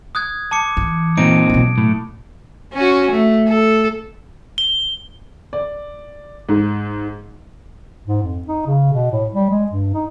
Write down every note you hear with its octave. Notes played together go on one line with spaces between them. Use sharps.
D#6 F#6 G#6
A5 D6 C#7
E3
A#2 C4 D#4 D7
B2 F#3
A2
C#4 F#4
A3
A4
G7
D5
G#2
G#2
F2
D#4
C#3
B2
A2
G3
G#3
G2
D#4